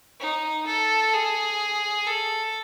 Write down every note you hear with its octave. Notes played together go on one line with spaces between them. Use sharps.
D#4
A4
G#4
A4